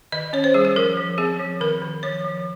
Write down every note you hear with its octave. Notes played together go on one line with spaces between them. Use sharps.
D#3 D#5
C#4 C#5
C5
G3 G#4
G#4
F3 A#4
F3
C4 G#4
F3
D#3 A#4
D#3
F3 C#5
F3